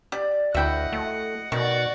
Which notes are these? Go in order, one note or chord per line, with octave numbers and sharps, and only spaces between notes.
G4 D5
D2 E4 F#4 D#5 E5 F#5 G5
A3
B2 D#3 F#4 D5